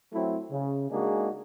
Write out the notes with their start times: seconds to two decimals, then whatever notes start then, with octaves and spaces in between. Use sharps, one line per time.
0.13 F#3 A3 C4 E4
0.51 C#3
0.91 G#3 A#3 D4 D#4 F#4 G#4